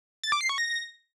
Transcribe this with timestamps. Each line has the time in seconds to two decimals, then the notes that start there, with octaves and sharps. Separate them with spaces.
0.24 A6
0.32 D6
0.41 C7
0.49 C#6
0.58 A#6